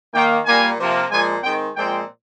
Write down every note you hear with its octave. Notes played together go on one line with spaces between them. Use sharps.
D#3 A#3 G5
A#2 G3 A#3 G#5
C3 F3 A#3
A#2 F3 G#3 G#5
D#3 G#3 C4 G5
A#2 F3 G#3 C4 G5